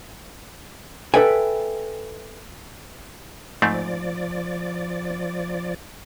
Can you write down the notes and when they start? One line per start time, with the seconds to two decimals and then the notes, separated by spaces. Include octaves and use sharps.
1.14 A4 B4 E5 G5 G#5
3.62 G#2 F3 A3 C4 D5